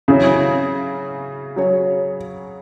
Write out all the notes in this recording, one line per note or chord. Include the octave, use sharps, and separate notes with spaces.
C#3 F#3 C#4 E4 G#4
F#3 C#4 G#4 C#5